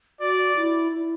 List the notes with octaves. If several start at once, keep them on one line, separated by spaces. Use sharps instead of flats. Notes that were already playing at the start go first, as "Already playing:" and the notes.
F#4 D5
E4
E4